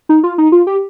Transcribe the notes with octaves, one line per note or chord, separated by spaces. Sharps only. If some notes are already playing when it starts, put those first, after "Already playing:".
D#4
F4
D#4
F4
G4